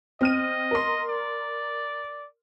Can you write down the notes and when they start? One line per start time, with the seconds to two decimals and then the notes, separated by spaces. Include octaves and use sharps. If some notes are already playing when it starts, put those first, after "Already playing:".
0.21 C4 D#5 F6 D#7
0.71 A#4 C6
1.09 D5